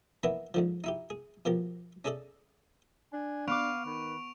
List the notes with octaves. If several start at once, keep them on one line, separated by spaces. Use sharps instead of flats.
E3 A#3 B3 D4 E4
G#2 D3 F3
D#4 E4 G4
G#4
B2 F3 A#3 G4
C#4 D4 G#4 A4 D5 D#5
D4 G#5
B3 F5 C#6 D6 D7 F7
D#3 B4